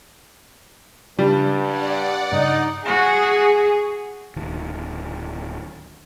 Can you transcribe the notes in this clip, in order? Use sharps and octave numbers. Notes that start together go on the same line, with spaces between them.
G2 C#3 G3 D4
D5 F#5
G2 C#3 D#4
F#4 G#4
D1 D#3